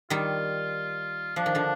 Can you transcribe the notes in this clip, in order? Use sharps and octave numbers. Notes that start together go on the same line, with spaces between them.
D#3 G3 F4
F3 D4
D#3
D3 F3